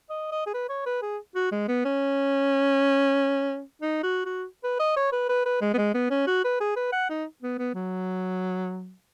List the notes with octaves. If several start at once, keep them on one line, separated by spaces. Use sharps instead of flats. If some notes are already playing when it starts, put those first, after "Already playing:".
D#5
D#5
G#4
B4
C#5
B4
G#4
F#4
G#3
B3
C#4
D#4
F#4
F#4
B4
D#5
C#5
B4
B4
B4
G#3
B3
G#3
B3
C#4
F#4
B4
G#4
B4
F#5
D#4
B3
B3
F#3